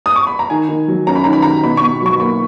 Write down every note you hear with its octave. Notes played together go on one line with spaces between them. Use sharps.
D#6
C#6
B5
A#5
D#3 G#5
D#3
F#3
C#4 A#5
B5
D#3 A#5
B5
D#3 A#5
B2 B5
B2 C#6
F#3 C#6
A#3 B5